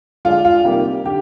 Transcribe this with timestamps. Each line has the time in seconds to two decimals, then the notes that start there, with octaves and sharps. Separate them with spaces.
0.25 D3 G#3 D4 F4
0.45 F4
0.65 C3 D#3 G3 A#3 G4
1.05 D3 G4